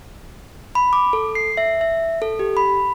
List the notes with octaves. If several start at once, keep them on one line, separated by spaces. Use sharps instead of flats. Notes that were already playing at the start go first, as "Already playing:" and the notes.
B5
D6
A4
C7
E5
E5
A4
G4
B5